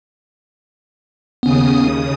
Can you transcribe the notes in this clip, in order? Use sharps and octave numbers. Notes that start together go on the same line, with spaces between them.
D#2 C#3 B3 C#4 D#6